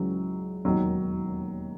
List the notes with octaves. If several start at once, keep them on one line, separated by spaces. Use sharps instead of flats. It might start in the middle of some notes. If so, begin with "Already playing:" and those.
Already playing: C#2 C#3 E3 F#3
E1 D#2 D#3 F#3